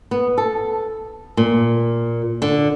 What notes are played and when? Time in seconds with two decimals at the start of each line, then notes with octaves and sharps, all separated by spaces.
0.11 B3
0.38 A4
1.37 A#2
2.42 D3